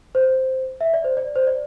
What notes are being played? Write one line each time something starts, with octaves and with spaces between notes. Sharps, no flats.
C5
E5
D5
C5
D5
C5
D5